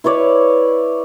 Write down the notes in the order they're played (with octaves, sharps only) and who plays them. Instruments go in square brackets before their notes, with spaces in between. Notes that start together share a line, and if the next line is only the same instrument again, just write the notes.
[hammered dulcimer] E4 B4 C#5 D5